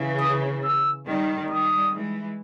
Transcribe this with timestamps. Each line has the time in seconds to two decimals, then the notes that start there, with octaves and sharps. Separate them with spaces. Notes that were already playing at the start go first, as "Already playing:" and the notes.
Already playing: C#3 E3
0.20 D#6
0.64 E6
1.07 D#3 G3
1.50 D#3 G3 D#6
1.93 E3 G#3